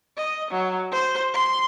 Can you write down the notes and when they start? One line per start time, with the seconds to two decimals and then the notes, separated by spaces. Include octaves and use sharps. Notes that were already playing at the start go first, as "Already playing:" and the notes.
0.17 D#5
0.51 F#3
0.92 C5
1.34 C6